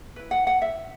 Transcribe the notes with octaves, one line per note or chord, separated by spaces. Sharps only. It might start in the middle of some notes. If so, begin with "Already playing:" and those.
E4 B4
F#5
F#5
E5